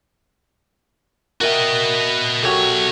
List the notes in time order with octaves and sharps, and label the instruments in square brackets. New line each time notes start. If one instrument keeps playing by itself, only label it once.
[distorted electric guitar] F#4 D#5 [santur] A#4 E5 G5
[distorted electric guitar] B2 C#5 [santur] F#4 G4 A4